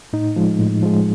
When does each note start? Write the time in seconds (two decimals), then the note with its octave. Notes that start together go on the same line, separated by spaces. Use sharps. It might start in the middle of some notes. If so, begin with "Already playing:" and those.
0.13 A2 D#4
0.36 F3 G#3
0.59 A2
0.83 F3 G#3